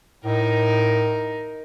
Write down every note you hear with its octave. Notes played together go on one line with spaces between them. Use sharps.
A2 D#4 A#4